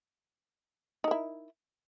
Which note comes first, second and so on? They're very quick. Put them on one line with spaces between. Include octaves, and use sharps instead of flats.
D#4 A#4 E4